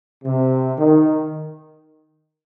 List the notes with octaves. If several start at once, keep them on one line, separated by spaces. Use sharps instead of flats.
C3
D#3